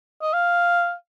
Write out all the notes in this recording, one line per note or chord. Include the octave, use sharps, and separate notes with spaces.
D#5
F5